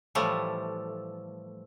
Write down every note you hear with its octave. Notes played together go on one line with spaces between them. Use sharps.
A2 E3 F3 G3 A3